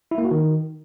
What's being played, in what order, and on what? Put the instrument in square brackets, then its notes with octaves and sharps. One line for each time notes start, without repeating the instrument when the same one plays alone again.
[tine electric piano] E4
A#3
F#4
D#3